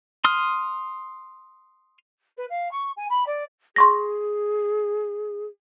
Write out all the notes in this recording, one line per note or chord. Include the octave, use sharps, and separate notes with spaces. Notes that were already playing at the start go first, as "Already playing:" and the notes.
C6 D#6 F6
B4
F5
C#6
G#5
B5
D5
G#4 C6 C#6 A#6